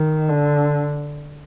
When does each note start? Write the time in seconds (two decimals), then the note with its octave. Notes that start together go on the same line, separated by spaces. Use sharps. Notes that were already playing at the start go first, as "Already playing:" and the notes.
Already playing: D#3
0.30 D3